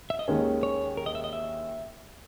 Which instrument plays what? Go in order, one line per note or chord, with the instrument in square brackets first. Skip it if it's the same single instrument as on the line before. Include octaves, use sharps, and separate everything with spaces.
[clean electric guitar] E5
D#5
[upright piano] D#2 D#3 G#3 C#4
[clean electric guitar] C#5
A#4
D#5
E5
D#5
E5